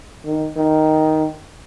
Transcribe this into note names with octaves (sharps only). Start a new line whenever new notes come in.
D#3
D#3